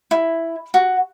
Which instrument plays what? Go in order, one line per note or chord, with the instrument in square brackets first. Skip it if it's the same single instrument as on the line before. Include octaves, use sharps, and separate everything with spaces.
[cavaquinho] E4
F#4